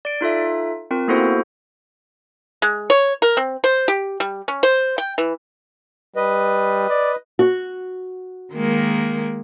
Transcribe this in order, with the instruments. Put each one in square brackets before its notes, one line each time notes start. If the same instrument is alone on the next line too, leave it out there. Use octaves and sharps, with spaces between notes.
[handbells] D5 D7
D#4 F4 A4 E5
C4 F4 A#4
A#3 B3 E4 F#4 A4 C5
[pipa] G#3
C#5
A#4
C4
C5
G4
G3
C#4
C5
G5
E3
[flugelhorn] G3 [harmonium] B4 D#5
[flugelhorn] D5
[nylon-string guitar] F#4
[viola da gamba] D#3 G#3 A#3